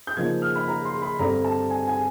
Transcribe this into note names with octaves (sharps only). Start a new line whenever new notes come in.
G6
C#3 F3 A#3 D#4 G#6
F6
B5
A#5
C6
B5
G2 D3 G3 C4 A#5
A5
G#5
G#5